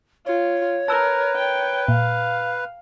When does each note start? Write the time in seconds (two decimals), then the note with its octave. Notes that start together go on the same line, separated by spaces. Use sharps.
0.26 F4 C#5
0.88 A#4 B4 A5 E6
1.36 G5
1.88 A#2 F5